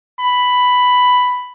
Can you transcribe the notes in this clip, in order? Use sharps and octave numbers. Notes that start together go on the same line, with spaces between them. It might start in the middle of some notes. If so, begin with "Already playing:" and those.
B5